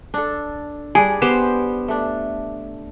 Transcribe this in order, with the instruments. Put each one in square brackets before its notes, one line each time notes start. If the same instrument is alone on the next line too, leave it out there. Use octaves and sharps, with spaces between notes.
[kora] D4 A4
[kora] G3 D4 [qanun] G#4 [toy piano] G#5
[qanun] B3 G4 C5
[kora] A3 D4